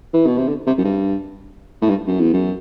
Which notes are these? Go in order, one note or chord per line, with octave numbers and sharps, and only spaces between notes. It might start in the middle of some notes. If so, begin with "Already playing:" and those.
E3
B2
C3
D3
C3
F#2
G2
A2
G2
F#2
E2
F#2